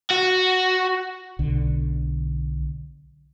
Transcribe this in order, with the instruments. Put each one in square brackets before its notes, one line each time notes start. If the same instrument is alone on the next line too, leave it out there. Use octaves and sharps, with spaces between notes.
[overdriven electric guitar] F#4
[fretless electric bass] B1 D3